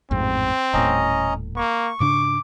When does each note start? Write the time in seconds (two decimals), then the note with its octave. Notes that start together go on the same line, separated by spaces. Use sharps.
0.11 A1 F2 G#2 C4
0.74 D#1 A2 C#4 D#5 A#5
1.56 A#3 C#6
2.00 G#2 C#3 D4 D6